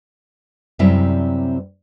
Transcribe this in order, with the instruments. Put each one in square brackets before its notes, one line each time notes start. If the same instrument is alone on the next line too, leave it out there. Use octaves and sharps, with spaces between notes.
[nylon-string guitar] F#2 C3 G3 C4 E4 E5